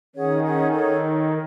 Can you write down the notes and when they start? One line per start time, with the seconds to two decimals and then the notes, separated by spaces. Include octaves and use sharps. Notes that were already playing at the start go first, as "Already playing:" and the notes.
0.16 D#3 C#4 G#4 C#5 F#5
0.45 C#4 G#4 C#5 F#5
0.72 D#4 A4 C#5